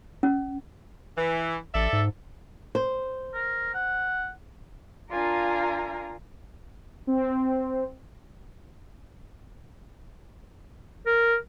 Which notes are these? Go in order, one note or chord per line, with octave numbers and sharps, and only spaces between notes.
C#4
E3
A1 A4 D5 E5
G#2
C5
A#4
F#5
D4 F4 A#4 F5 G#5 A#5
C4
A#4